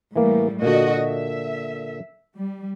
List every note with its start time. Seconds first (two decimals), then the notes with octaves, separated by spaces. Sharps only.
0.16 A2 E3 G3 A#3
0.62 A#2 D3 F#4 D#5
1.03 E5
2.36 G3